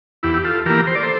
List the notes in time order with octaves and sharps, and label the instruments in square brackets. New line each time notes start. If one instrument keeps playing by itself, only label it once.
[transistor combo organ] E2 E4 G4
G4
F4 A4
E3 A#3 G4 A#4
C5
D5
A4 C5